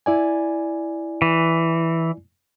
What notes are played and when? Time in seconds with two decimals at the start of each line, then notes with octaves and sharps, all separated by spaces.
0.06 E4 D5 G#5
1.22 E3